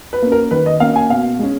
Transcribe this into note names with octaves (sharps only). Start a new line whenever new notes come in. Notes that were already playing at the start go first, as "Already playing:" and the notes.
B4
A#3 C#4
A#4
D#3 B4
D#5
A#3 C#4 F5
G#5
B2 F5
G#3 C#4